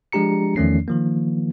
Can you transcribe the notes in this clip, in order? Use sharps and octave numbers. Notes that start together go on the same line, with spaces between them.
F3 G#3 D4 G4 A#5 C#7
E2 D#3 F3 A3 C#4 C7
D#3 F3 A#3